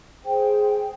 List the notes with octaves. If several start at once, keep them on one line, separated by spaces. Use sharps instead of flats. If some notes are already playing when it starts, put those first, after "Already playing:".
G#4 C5 G5